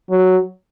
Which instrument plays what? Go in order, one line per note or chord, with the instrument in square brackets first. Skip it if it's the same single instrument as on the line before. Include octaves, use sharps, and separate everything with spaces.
[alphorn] F#3